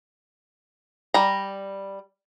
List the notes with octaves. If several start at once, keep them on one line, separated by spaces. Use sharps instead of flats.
G3 A#5